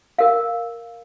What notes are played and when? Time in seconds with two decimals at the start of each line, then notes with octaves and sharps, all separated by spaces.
0.18 A#4 F5